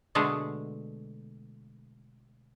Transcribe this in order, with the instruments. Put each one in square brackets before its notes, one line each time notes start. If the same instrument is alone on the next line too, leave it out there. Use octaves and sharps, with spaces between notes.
[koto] B2 D3 G#3 A3 F#5